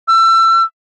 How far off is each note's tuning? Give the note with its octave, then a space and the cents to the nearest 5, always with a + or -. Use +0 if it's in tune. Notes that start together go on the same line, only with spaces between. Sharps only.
E6 +30